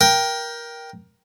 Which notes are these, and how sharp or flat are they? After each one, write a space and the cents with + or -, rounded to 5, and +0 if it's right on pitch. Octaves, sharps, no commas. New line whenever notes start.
A#4 +15 G5 +0